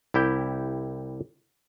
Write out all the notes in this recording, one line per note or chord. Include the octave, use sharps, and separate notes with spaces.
C2 E4 G4 G5